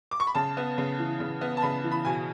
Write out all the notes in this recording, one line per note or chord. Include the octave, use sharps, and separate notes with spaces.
D6
C#6
B5
C#3 A5
B3
C#3
E3
C#3
B3
A5
C#3 B5
E3
B5
B2 G#5